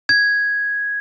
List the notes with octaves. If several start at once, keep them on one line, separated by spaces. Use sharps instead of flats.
G#6